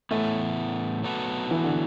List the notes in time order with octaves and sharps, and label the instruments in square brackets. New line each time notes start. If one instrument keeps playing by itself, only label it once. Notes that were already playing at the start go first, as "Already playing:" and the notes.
[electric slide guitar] A2 E3 B3 [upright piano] A3
[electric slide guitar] F#3 B3 F#4 A4
[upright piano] E3
D3